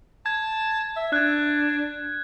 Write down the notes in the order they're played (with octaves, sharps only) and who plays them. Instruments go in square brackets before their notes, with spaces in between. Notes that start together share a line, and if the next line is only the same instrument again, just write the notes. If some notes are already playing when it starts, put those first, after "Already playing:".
[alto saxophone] A5 [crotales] G#6
[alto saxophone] E5
[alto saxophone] D4 [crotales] F#6 G#6